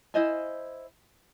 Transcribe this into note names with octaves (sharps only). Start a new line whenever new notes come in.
E4 C5 D#5 G#5